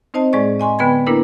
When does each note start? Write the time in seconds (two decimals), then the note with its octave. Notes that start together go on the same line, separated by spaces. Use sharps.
0.14 C4 D#4 C5 D#5 A5
0.33 A2 G#3 G#4 D5 C#6
0.60 D#5 G#5 C6 C#6
0.79 D3 B3 B4 G5 B5 G#6
1.07 A#3 D4 E4 A#4 B4